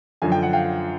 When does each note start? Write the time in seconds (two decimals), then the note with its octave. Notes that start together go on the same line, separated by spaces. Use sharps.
0.22 F#2 D3 F3 G#5
0.32 G5
0.43 F#5
0.53 F5 G5